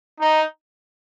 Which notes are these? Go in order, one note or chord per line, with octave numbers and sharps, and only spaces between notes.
D#4